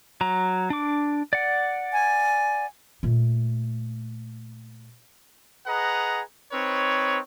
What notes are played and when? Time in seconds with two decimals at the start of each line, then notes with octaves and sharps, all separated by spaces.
0.21 F#3 A#5
0.70 D4 D6
1.33 D5 F#5
1.93 G#5
3.03 A#2 A3
5.67 G#4 B4 D#5 F#5 A#5
6.52 C4 D#4 B4 C#5